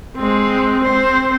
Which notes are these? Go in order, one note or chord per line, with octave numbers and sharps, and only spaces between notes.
G#3 C4
C4 C5